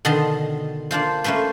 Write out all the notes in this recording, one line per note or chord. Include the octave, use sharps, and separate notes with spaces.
B2 D3 D#3 D#5 A5 C6
A#3 D4 F4 C5
A3 A#3 C#4 B4 C5